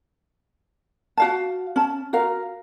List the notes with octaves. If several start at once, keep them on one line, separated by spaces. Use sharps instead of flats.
F#4 F5 A5
C#4 A5
F#4 A#4 F5